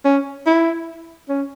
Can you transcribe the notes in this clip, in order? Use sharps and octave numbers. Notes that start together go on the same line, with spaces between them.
C#4
E4
C#4